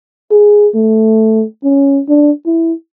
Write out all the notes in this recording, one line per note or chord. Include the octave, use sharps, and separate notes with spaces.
G#4
A3
C#4
D4
E4